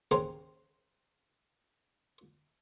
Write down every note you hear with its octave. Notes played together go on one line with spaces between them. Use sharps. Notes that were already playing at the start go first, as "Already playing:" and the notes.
D#2 C#3 C4 C5 A#5 C6